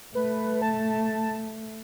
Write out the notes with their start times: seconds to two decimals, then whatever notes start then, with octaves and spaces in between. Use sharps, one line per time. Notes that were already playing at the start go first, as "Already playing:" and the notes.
0.15 A3 B4
0.62 A5